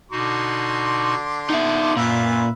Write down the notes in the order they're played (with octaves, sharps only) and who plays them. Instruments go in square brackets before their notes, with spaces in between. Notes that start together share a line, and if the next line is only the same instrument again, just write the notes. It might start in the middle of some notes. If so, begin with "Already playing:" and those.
[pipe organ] B2 D#4 F#4 [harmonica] D3 C6 D6
[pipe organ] B3 [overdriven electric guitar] D#4 E5
[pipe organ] F#2 [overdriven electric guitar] A#2 [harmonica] F4 B4 E5